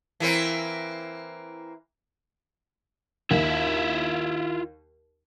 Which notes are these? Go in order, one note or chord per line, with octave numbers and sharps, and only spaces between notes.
E3 A#3 C4
D#2 E4 F4 E5